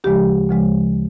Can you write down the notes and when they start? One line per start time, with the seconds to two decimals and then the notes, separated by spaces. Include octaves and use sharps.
0.04 D2 C#3 F3 G#3 G4
0.49 D2 C#3 F3 G#3